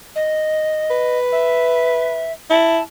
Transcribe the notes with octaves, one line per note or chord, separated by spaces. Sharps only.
D#5
B4
E5
E4 A5